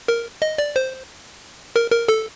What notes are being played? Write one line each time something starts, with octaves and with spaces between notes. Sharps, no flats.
A#4
D#5
D5
C5
A#4
A#4
A4